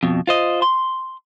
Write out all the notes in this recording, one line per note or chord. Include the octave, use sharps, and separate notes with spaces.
F2 B2
F4 C5 D#5
C6